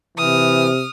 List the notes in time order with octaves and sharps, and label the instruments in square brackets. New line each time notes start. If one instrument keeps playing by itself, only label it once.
[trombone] C3 [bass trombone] E3 [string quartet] D#6 F6